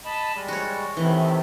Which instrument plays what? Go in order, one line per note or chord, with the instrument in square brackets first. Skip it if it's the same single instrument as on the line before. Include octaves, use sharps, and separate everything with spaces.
[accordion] D#5 A5 B5
G3 G#3
[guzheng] F#4 C#5
[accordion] A2 C3 D#3 [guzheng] E3